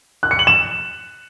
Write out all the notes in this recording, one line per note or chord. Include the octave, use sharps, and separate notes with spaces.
F#6
C#7
F#7
E7